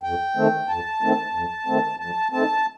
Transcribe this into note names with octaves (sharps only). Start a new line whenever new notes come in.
F2 G5
D#3 A3 C4
F2 A5
D#3 A3 C4
F2
D#3 A3 C4
F2 A5
D#3 A3 C4 A5